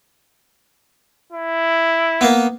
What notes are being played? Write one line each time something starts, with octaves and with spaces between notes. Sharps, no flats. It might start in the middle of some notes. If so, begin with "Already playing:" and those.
E4
A#3 B3